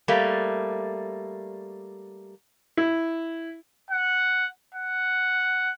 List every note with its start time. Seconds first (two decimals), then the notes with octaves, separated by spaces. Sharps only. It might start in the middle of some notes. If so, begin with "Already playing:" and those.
0.08 G3 A3 A#3
2.77 E4
3.91 F#5
4.74 F#5